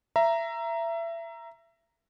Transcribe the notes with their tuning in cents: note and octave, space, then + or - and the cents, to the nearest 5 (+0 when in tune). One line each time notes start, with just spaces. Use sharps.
E5 +25 A#5 +0